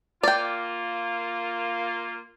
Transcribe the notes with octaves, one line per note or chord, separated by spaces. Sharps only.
A#3 F4 D5 G5